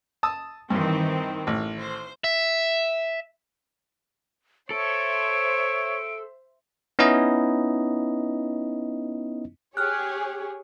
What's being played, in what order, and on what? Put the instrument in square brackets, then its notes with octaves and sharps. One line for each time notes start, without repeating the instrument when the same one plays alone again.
[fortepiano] A5 D#6 E6
[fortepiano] G2 [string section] D#3 E3 C4
[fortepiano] A1
[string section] C5
[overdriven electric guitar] E5
[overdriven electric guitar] A4 [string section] C5 E5 [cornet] C#5 [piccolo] D7
[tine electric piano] B3 C#4 D#4 E4 D#5
[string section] G4 G#4 C#5 [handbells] F6 F#6